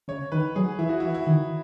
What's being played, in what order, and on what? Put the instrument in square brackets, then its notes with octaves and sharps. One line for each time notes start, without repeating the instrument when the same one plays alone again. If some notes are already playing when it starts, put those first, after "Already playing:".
[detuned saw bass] C#3 [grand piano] C#5
[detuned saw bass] D#3 [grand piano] B4
[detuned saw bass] F#3 [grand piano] G#4
[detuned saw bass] E3 [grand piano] E4
[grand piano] F#4
[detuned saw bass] E3 [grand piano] E4
[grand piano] E4
[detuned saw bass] D#3